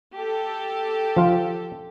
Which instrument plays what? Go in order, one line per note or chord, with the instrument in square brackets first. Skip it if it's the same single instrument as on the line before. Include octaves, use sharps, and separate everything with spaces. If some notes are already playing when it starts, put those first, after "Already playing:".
[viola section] G4 A4
[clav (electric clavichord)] F3 F4